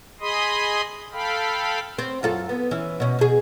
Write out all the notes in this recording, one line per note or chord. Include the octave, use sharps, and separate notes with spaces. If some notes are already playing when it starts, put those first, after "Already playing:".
G#4 D#5 B5 C6 D#6
A4 F5 G5 B5
C4
F#2 F4 A4
B3
E3 C#4
B2 C#4
B2 G#4